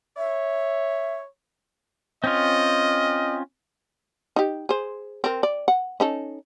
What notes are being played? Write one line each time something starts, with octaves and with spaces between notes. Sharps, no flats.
C#5 E5
C4 C#4 F4 D#5
D#4 G4
G#4 C5
C4 A#4
D5
F#5
C#4 D#4 A4